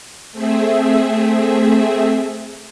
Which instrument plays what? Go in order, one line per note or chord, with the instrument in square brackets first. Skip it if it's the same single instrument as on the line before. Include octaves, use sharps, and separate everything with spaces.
[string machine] A3 C4 G#4 E5